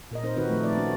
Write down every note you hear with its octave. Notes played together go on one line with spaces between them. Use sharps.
A#2 A#4 D#5
C4 D#4 A#4 C5
D#3 C4 D#4 F#4 B4
D#3 F3 A3
D#4 D5
A#3 C#4 F#4